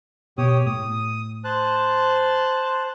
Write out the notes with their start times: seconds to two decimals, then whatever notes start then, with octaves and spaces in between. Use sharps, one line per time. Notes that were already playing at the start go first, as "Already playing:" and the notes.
0.38 B2 G4 C#5 D#6
0.66 A2 D#6
1.44 C5 A5 F#6